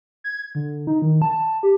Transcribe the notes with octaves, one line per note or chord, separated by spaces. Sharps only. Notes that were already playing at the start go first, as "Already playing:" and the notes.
G#6
D3
D#4
D#3
A5
G4